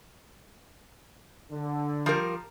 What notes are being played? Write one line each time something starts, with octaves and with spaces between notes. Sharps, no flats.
D3
F3 G3 A#4